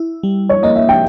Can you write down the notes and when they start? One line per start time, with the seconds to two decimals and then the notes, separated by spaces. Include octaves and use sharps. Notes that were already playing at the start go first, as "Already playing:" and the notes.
Already playing: E4
0.23 G3
0.49 C#5
0.63 A#3 D#5
0.76 E5
0.89 G5